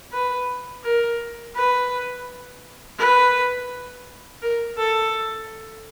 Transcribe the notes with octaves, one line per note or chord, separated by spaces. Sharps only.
B4
A#4
B4
B4
A#4
A4